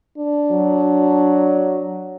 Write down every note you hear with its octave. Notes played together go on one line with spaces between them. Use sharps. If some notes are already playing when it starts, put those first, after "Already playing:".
D4
F#3